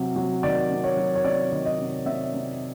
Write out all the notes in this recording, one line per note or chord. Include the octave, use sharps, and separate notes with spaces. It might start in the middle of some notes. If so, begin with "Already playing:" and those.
Already playing: C3 F#3
F#3
D#3 D5
C3
C#5
F#3
C#5
C3 D5
D#3
D#5
C3
C3 E5
C3